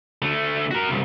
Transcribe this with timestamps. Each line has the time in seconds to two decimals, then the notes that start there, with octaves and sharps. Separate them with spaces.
0.22 D3 A3
0.71 F#4 A#4
0.90 C2 G2